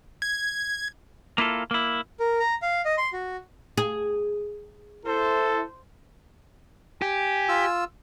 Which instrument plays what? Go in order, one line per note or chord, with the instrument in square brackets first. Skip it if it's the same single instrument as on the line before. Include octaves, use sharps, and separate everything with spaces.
[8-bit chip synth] G#6
[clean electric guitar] A#3 E4 F4 A4
A#3 E4
[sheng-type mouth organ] A#4
A#5
F5
D#5
C6
F#4
[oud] G#4
[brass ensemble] E4 A4 [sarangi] C5
[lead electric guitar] G4 [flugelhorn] G#5
[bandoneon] F4 E6